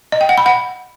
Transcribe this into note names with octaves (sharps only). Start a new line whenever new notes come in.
D#5
G5
F#5
B5
F#5